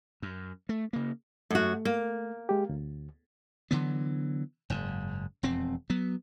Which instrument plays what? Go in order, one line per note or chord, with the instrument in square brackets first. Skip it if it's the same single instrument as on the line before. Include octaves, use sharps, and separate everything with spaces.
[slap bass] F#2
A3
C#3 A#3
[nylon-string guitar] F#2 F#4 [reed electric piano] A3
[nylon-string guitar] A#3
[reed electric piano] G#3 G4
D2
[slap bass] D3 E3 F#3 B3
F#1 G#2
E1 F2 C4
F#3 B3